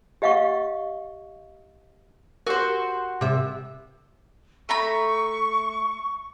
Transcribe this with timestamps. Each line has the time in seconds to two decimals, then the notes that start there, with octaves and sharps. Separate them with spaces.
0.22 G4 D#5 F5 F#5 C#6
2.47 F#4 G4 A#4 C5
3.21 C3 E5
4.69 A3 A#5 B5 C#6